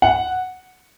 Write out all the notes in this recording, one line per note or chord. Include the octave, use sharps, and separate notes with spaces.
F#5